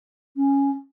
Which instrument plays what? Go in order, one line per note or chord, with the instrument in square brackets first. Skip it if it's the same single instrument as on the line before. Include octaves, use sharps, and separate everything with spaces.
[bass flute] C#4